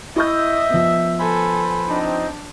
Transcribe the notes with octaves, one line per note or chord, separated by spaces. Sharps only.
E4 D#5 E5 C#6 G6
F3 B3
A4 B4 C5 G#5 B5
C4 D4 D#4